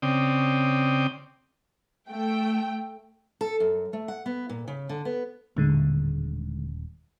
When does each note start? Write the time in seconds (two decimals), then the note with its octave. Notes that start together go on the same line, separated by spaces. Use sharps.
0.02 C#3 C4 D5 G5 D#6
2.10 A3 G5
3.41 A4
3.60 F#2
3.93 A3
4.08 F#5
4.26 B3
4.50 A#2
4.68 C#3
4.89 D3
5.05 B3
5.56 D#1 A2 D3 G#3